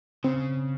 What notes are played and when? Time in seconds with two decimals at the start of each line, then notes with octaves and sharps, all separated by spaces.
0.24 C#3 C4